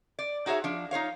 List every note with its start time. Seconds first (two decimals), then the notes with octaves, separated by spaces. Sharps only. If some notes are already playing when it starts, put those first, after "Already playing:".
0.19 D5
0.46 D#4 F#4 G#4 C#5 E5
0.64 F3 D4
0.91 D#4 F4 C#5 F5